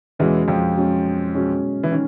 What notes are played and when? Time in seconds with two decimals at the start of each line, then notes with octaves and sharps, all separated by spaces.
0.19 E2 B2 E3 G#3 C#4
0.48 F2 F3
0.77 B2 G#3 C#4
1.34 B2 G#3 C#4
1.83 E3
1.92 D#3 C#4